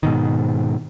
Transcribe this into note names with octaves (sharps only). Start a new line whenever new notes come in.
G#2 B2 D#3